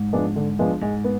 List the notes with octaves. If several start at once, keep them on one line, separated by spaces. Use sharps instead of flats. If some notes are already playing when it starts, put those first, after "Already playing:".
Already playing: G#2
F3 G#3 B3 D4
D3
F3 G#3 B3 D4
G#2 G#3
B3